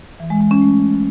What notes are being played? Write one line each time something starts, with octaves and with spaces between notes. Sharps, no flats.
E3
G#3
G#3
C#4
A3